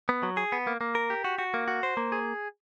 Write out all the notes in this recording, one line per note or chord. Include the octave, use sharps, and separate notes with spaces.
B3
F#3
G#4
B3
A#3
A#3
A#4
G4
F#4
F#4
A#3
F#4
C5
A#3
G#4